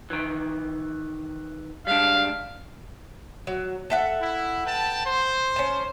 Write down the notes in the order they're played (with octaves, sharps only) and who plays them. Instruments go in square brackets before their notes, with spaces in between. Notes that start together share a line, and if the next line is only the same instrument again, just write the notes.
[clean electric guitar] D#3 E3
[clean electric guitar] G3 G#3 D4 [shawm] F5
[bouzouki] F#3
A4 E5 F#5
[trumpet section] E4
B4 G5 A5
C5
[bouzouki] C#4 A5